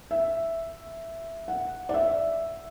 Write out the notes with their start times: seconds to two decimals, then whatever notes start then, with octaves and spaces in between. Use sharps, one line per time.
0.11 E5
1.48 F#5
1.89 D5
1.94 E5